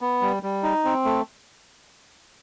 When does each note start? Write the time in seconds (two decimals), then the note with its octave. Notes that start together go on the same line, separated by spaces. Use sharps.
0.01 B3
0.21 G3
0.43 G3
0.63 D#4
0.84 C4
1.05 A3